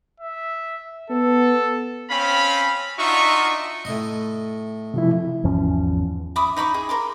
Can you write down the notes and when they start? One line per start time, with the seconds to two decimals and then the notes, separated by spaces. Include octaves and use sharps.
0.21 E5
1.10 B3 A4
2.09 C4 C#4 F5 B5
2.98 D4 D#4 F4 F#4 E5 C#6
3.85 A2 D#5
4.94 C3 F3 E4
5.44 G#1 E2 F3 C#4
6.36 E5 B5 D6 D#6
6.56 D#4 B5 C#6 D6
6.74 G#4
6.89 A#4 C6 D6